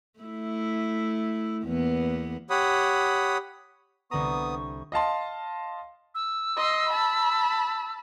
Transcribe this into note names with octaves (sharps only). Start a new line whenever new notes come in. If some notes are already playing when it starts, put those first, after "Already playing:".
A3 E4
E2 A#3 B3
G4 C#5 F#5 B5 D#6
C2 D3 B3 A#5 C#6 D#6
D#5 F5 A5 C6
E6
D#5 C6
A5 B5